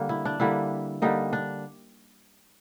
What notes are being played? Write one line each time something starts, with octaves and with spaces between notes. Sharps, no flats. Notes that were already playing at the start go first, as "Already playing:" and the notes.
Already playing: D3 G3 A#3
E4
D4
D3 G3 A#3 E4
D3 G3 A#3 D#4
D4